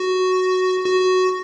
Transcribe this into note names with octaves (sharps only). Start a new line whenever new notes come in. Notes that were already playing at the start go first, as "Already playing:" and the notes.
Already playing: F#4
F#4